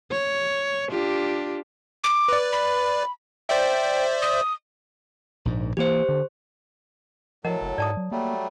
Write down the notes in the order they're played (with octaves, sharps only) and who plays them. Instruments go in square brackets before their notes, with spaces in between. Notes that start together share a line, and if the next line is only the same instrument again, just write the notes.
[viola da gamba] C#5
D4 F4 G4
[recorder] D6
[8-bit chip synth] B4 D5
[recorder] B5
[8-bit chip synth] C5 D5 E5 [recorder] G5
[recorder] D#6
[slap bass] A#1 G#2
[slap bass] E3 A#3 [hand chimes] G4 C5
[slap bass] D3
[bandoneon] A2 F#3 A4 [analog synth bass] F3 [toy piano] A#4 D#5 F#5
[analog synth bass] F#1
[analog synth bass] G#2 [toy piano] D5 A5 D#6
[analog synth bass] F#3
[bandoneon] F#3 G3 A3 [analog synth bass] A#3